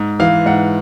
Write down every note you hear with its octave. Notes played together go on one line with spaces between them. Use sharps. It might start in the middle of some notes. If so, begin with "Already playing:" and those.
Already playing: G#2
E3 F5
G#2 F#5